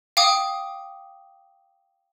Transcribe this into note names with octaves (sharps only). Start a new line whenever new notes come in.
F5 G5 D6 D#6